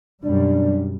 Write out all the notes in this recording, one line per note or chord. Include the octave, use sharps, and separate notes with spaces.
F#2 B2 G3 D4